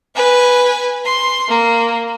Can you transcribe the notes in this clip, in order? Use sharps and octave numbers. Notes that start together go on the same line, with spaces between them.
B4 G#5
C6
A#3